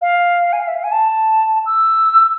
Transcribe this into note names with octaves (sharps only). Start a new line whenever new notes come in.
F5
G#5
F5
E5
F5
G#5
A5
E6